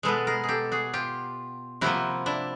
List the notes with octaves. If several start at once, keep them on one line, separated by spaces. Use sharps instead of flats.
B2 G#3 B3 A4 B4
G#4 A#4
G#4
G4 A4
F#4 G#4
F4 G4
C3 F3 A#3 E4 F#4
D4 E4